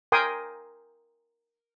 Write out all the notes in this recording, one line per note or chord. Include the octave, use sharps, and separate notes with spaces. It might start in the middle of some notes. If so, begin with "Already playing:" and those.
A#4 G5 G#5 C6 D#6